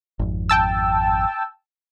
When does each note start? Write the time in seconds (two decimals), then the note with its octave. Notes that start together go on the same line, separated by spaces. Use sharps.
0.19 G#1 F2
0.49 G5 A5 E6